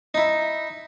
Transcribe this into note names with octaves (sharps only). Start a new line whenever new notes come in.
D#4 E4